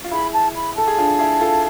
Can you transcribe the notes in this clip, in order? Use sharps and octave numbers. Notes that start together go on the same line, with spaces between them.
F4
E4 G#4 B5
A5
B5
A4 A5
G#4
D4 F4
E4 G#4
F4 A4